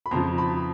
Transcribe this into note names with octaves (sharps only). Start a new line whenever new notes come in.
B5
F2 C#3 F3 A#5 C6
A5 B5